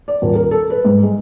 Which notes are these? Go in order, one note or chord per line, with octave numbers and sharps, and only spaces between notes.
D5
D#1
A#4
A4
B4
G#2
G#3